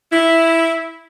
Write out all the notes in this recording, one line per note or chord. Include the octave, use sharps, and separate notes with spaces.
E4